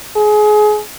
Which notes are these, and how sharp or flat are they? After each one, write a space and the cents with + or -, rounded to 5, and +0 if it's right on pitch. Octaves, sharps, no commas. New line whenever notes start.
G#4 +25